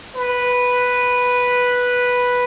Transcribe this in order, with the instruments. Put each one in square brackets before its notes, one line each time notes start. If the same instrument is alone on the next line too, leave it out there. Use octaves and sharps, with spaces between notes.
[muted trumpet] B4